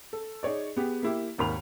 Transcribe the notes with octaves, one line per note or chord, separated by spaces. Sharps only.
A4
D#4 G#4 C#5 D5
B3 G4 G#4
A#3 E4 G4
G#1 D#2 A#4 B5 F7